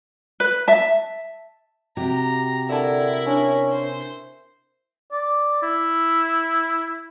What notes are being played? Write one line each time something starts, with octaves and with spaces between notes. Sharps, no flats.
B4
E5 A5
C3 F#4 G4 A#5
D3 E4 A#4 E5 A5
C#4 D4
C5
D5
E4